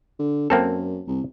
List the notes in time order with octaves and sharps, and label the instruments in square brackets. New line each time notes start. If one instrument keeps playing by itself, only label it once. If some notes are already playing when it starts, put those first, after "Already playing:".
[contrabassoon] D3
[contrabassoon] F#2 [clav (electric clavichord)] A#3 C4 A4
[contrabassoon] C2